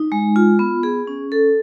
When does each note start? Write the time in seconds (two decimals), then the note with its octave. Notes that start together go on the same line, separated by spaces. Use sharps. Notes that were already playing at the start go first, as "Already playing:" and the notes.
Already playing: D#4
0.12 G#3
0.36 F4
0.59 B3
0.83 G#4
1.07 C#4
1.32 A4